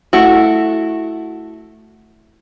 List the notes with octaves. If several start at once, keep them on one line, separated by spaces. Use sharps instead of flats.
A3 E4 F#4